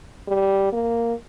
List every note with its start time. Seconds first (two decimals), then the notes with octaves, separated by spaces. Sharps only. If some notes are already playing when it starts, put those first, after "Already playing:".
0.28 G3
0.73 A#3